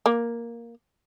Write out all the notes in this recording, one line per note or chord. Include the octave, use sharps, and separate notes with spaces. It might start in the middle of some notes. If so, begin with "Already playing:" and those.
A#3